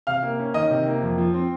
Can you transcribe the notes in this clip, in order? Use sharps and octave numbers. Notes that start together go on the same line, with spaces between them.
C3 F5 F6
A#3
C#4
D#3 D#5 D#6
C3
A#3
F2
F3
C4